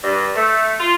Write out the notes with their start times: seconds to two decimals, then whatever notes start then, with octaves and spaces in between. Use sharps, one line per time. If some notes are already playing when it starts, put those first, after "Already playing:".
0.04 G2
0.36 A3
0.79 F4